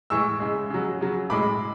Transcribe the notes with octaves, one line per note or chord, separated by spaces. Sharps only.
A2 E3 G#3 C#6 E6
C#3 G#3
C#3 F#3
C#3 F#3
A2 G#3 B5 D6